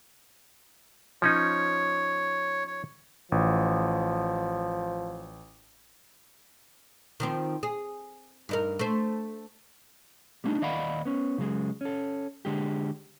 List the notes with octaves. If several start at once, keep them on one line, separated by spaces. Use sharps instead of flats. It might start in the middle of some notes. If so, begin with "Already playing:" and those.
F3 C#4 D#4 C#5
C#5
A1 F3
D#3 F3 C4
G#4
G2 D#4 A#4
A3 C5
G3 A3 A#3 D4 D#4
D#2 D5 D#5 F5 F#5 B5
B3 C#4
C#3 F#3 G#3
C#4 A4
D3 G#3 G4